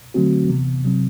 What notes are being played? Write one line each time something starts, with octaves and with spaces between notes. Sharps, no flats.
D3 F#3 A3 C4 F#4
C3 E3 B3
C3 F#3 C4